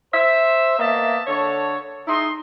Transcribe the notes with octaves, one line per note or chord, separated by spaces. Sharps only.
C5 E5
A#3 B3 D#5 E5 A5
D3 A4 C#5
D#4 E4 G#4 C6